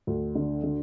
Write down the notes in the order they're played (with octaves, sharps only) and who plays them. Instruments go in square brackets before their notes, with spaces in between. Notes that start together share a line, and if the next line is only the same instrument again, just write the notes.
[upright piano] D2
D3
D3